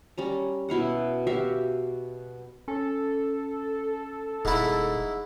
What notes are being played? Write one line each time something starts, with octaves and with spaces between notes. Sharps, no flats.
G3 C#4 A#5
B2 E4 F5 F#5
F#4 G4 E5 F5
C#4 A4
D#1 G#2 E4